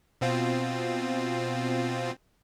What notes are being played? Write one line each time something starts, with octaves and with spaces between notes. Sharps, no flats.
B2 C4 F4